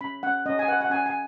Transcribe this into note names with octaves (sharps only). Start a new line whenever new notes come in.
C#4 B5
C#4 F#5
C#4 D#5
G#5
B4 F#5
F#5
C#4 G#5
G#5